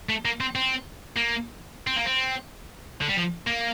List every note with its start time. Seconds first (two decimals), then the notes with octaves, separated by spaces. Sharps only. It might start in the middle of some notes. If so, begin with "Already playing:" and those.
0.09 A3
0.25 A#3
0.41 C4
0.55 C4
1.16 A#3
1.87 C4
1.96 A#3
2.06 C4
3.01 D3
3.08 G3
3.17 F3
3.47 A#3